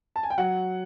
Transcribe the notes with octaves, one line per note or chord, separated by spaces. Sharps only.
A5
G#5
G5
F#3 F#5